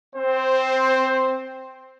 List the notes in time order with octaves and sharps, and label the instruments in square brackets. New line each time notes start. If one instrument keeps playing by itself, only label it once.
[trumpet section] C4 C5